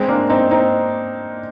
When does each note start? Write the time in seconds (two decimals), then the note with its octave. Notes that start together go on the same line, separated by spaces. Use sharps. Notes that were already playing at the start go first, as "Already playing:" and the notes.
Already playing: G#3 C4
0.08 A#3 D4
0.30 C4 D#4
0.51 C4 D#4